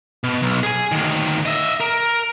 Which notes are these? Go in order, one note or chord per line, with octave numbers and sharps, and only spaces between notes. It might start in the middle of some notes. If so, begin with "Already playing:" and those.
B2
B1
G#4 G#5
D2 D#3
D#5 E5
A#4